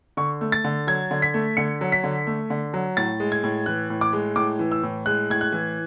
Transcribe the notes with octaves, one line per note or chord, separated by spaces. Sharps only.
D3 C#6
A3
A6
D3
F#3 G#6
D3
B6
A3
D3 C#7
F#3
B6
D3
A3
D3
F#3
A2 A6
G#3
G#6
A2
E3 F#6
A2
D6
G#3
A2 D6
E3
E6
A2
G#3 F#6
A2 G#6
F#6
E3